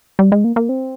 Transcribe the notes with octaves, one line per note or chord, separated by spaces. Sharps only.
G3
G#3
A#3
A#3
C4